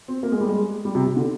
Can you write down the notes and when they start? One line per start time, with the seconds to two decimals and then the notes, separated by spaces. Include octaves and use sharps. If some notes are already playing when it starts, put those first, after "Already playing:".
0.08 C4
0.23 A#3
0.32 G#3
0.40 G3
0.49 G#3
0.85 G3
0.95 C3
1.06 C3
1.16 D3